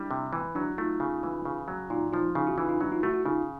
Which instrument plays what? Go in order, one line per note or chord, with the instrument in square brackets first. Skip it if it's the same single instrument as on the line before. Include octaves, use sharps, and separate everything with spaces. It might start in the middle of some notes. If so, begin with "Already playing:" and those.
Already playing: [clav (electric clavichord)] G3 [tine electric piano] D4 E4
[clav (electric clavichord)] C3
E3
[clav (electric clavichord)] F#3 [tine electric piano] D4 E4
[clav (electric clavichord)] A3 [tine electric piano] D#4 F4
[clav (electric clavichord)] C#3
E3
C#3
F#3
[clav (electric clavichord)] A#2 [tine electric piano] D#4 F4
[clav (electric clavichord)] F3 [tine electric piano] D#4 F4
[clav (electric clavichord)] C#3 [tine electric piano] D#4 F4
[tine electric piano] E4 F#4
[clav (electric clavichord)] E3 [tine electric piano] D#4 F4
[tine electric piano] D#4 F4
[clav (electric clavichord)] F#3 [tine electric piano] D4 E4
[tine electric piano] D#4 F4
[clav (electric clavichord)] A3 [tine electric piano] E4 F#4
[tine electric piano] E4 F#4
[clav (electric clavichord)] C#3 [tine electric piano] D#4 F4